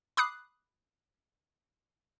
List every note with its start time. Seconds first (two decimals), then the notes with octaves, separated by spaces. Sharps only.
0.17 B5 D6 D#6 F#6 C7